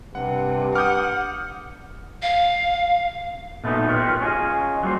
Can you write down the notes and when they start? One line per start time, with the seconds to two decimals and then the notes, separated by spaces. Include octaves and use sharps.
0.15 G2 C3 F#5
0.75 F#5 D6 D#6 F6 G6
2.22 F5
3.64 A#2 A3 B3 D#4
3.88 F4 G4 A#4 B4 C#5
4.21 C#4 D4 F4 G#4 D#5
4.83 F#3 G3 A#3 C5